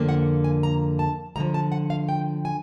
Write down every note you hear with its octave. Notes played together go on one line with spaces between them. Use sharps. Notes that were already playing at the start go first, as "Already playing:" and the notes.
Already playing: F2 D3 F3 A#3
F#5
G#5
A#5
A5
D2 D3 F3 A#5
A5
F#5
F5
G5
G#5